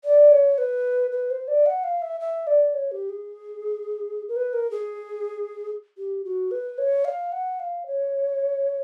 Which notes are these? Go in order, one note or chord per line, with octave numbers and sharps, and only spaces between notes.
D5
C#5
B4
B4
C5
D5
F#5
F5
E5
E5
D5
C#5
G4
G#4
A#4
B4
A#4
G#4
G4
F#4
B4
C#5
F5
F#5
F5
C#5